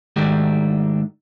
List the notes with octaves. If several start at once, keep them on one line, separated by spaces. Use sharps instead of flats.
G#2 D#3 A3 D4 F#4 G4